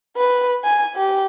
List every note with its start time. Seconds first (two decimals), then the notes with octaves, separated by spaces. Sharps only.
0.17 B4
0.64 G#5
0.96 G4